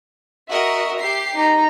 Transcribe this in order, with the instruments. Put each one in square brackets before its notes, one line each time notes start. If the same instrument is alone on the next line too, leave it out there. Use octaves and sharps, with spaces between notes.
[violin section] F#4 A#4 D#5 [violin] E5
[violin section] G4 C7
[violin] D#4 A#5